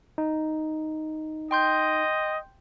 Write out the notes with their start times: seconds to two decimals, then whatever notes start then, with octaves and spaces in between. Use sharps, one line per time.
0.18 D#4
1.51 D#5 G5 C6 G6